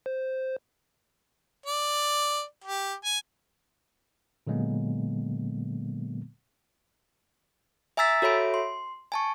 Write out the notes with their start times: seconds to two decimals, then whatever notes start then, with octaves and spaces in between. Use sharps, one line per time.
0.06 C5
1.66 D5
2.64 G4
3.05 G#5
4.47 A#2 D3 F#3 G#3 A#3 B3
7.97 E5 G#5 A#5 E6 A6 B6
8.22 F#4 A4 C#5 E5 B5 D7
8.54 C6
9.12 G#5 A5 C#6